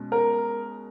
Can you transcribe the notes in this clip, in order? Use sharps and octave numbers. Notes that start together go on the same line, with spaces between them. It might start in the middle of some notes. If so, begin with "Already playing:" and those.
Already playing: B2 G#3 C#4
A#4